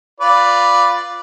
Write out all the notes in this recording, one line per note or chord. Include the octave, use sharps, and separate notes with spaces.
F4 B4 D5